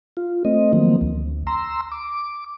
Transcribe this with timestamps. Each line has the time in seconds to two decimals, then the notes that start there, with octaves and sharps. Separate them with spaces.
0.17 F4
0.45 A3 C4 D#5
0.73 D#3 F3 F#3 A#3 C4
1.01 D2
1.47 A#5 C6 E6
1.92 D6